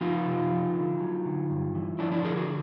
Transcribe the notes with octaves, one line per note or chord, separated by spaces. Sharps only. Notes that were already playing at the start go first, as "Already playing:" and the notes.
F3 D#4 F4
C3
F3
D3
F#3
D3
G2
E3
F3 D4 E4
D4 E4
D3 G#4 A#4
F#4 G#4